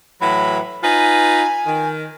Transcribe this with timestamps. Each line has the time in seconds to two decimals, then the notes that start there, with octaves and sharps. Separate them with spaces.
0.21 A2 E3 F#3 B5
0.83 D#4 F4 B4 G#5
1.65 D#3